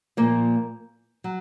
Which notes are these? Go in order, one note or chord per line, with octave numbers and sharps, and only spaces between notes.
A#2 F3 A#3
F#3